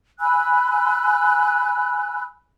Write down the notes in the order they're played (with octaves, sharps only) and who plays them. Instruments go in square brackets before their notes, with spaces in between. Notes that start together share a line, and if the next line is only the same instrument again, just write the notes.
[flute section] G#5 B5 E6 F#6